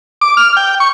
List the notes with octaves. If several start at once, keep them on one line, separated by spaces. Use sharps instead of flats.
D6
F6
G5
C#6